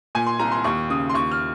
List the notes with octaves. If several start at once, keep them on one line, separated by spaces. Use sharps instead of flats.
A#2 G#5
C6
C2 A#5
C6
D#2 C#6
C#3 D#6
C6
D#2 C#6
F6